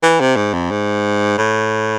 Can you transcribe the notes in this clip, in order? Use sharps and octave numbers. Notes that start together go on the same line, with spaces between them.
E3
C3
G#2
F2
G#2
A2